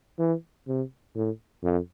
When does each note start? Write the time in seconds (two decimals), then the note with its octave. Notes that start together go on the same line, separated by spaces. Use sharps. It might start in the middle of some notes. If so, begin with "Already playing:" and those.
0.19 E3
0.67 C3
1.15 A2
1.63 F2